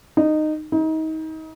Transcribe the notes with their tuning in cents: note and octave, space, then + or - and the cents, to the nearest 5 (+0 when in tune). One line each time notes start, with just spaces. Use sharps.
D#4 -15
D#4 +30